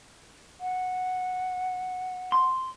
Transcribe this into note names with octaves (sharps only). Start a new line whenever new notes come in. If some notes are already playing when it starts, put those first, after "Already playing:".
F#5
C6